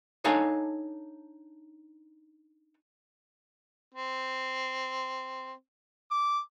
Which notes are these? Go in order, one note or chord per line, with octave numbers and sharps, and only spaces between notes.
D4 D#4 A4 C#5 F5 G#5
C4
D6